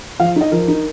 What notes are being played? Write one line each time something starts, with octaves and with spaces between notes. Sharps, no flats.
F3 F5
D#4 D#5
F3 A#4
D#4